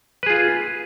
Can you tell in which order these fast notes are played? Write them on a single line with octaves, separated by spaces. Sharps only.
B4 G#4 F4